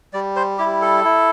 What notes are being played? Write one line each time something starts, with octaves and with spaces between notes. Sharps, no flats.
G3 D5
C5
E4 G4
A4
E4